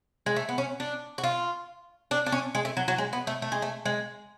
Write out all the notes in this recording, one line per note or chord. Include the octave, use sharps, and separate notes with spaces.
G#3
A3
B3
C#4
D4
F#4
F4
D4
D4
C#4
G#3
A3
F#3
F#3
G#3
B3
A3
A3
G#3
A3
G#3